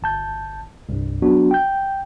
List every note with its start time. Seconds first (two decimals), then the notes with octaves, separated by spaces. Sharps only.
0.02 G1 A5 G6
0.89 C2 G2
1.22 F#3 B3 D4 F#4
1.51 G5 G6